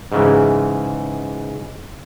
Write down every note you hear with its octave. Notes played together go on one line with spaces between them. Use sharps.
G#2 C#3 E3